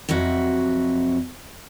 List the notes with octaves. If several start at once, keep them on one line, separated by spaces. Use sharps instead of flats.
F2 C3 F#3 F#4 E5